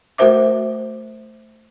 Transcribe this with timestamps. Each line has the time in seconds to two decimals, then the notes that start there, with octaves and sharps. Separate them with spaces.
0.18 A3 F#4 A#4 C5 E5 D6